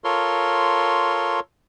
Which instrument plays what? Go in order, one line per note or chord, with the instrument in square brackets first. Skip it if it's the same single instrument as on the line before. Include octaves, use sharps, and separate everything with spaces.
[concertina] F4 A4 A#4 C#5 C6